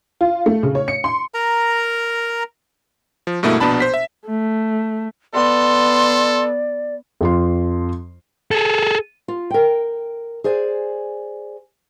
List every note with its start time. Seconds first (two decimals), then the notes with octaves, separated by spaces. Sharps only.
0.21 F4
0.46 A3
0.63 C#3
0.75 C#5
0.88 C#7
1.04 C6
1.34 A#4 A#5
3.27 F3
3.43 G2 B2 A3 A#3 E4
3.60 A#1 B2 B3 D4 A5 B5
3.80 C5 B6
3.94 E5
4.28 A3
5.34 B3 A4 D5 C6
7.21 F2 F4 C6
8.51 G#4 A4
9.28 F4
9.50 A#4 G5
10.44 G#4 C5 D5 G#5